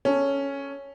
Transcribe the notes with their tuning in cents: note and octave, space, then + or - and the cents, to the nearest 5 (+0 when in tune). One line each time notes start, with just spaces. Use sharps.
C#4 +0 A4 +0